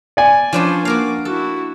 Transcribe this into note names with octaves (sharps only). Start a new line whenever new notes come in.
D5 G#5
F3 C#4 D4 B4 C5
A#3 F#4 A#4 F5 D6
E4 F#4 A4